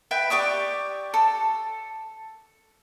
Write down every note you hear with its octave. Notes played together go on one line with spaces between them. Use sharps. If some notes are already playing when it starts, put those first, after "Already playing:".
B4 E5 G5
G4 D5 C#6 D#6
A4